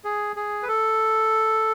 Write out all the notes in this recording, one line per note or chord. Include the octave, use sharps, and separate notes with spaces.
G#4
G#4
B4
A4